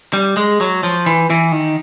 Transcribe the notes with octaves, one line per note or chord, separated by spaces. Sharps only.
G3
G#3
F#3
F3
E3
E3
D#3